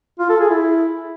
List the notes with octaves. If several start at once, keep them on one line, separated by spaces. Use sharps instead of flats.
F4
A4
G#4
E4